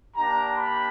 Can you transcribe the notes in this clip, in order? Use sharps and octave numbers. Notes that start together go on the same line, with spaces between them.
A#3 D4 G4 A#5
B5